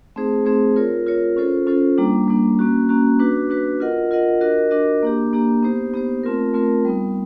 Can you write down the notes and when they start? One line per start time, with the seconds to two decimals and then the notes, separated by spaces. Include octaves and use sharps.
0.16 A3 C4 D#4 G#4 C5
0.45 A3 C4 D#4 G#4 C5
0.76 F4 A#4 C#5
1.06 F4 A#4 C#5
1.36 C#4 F4 A4 C5
1.67 C#4 F4 A4 C5
1.98 G3 A#3 D4
2.28 G3 A#3 D4
2.59 A#3 C#4 F#4
2.89 A#3 C#4 F#4
3.20 D4 F#4 B4
3.50 D4 F#4 B4
3.80 F4 A#4 D#5 F#5
4.11 F4 A#4 D#5 F#5
4.41 D4 F#4 A#4 D#5
4.71 D4 F#4 A#4 D#5
5.03 A#3 D4 G4
5.33 A#3 D4 G4
5.63 B3 D#4 G4 C5
5.94 B3 D#4 G4 C5
6.23 A3 C4 F4 A#4
6.54 A3 C4 F4 A#4
6.85 G3 B3 D#4